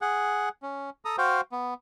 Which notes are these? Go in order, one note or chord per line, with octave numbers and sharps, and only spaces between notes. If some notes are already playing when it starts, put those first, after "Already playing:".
G#4 F#5
C#4
A4 A#5 D#6
F#4 C5 F5 G5
B3